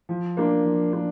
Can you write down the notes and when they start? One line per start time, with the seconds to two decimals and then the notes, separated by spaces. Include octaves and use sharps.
0.09 F3
0.37 A#3 D4
0.65 F3
0.93 A#3 D4